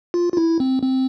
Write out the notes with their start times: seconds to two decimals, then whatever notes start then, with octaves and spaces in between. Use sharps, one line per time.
0.14 F4
0.33 F4
0.37 E4
0.60 C4
0.83 C4